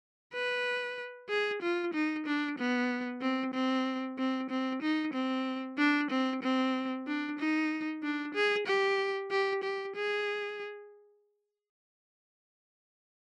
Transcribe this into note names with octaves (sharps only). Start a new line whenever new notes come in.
B4
G#4
F4
D#4
D4
B3
C4
C4
C4
C4
D#4
C4
D4
C4
C4
D4
D#4
D4
G#4
G4
G4
G4
G#4